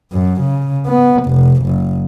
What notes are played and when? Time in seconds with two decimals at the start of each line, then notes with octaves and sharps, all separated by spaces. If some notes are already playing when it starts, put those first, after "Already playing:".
0.13 F#2
0.42 C#3
0.87 B3
1.24 F1
1.64 F#1